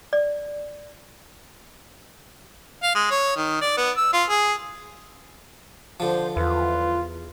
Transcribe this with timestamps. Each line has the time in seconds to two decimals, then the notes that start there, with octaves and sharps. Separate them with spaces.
0.13 D5
2.83 F5
2.95 G#3
3.11 C#5
3.36 D#3
3.61 D5
3.77 B3
3.97 E6
4.13 F4
4.29 G#4
6.00 D3 F3 C5
6.36 E2 F4 B4